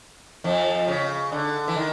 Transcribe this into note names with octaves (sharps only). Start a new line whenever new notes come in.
F2 F3
C#3
D3
E3
D#3